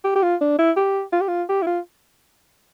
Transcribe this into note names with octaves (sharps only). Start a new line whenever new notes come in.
G4
G4
F4
D4
E4
G4
F4
G4
F4
G4
E4
F4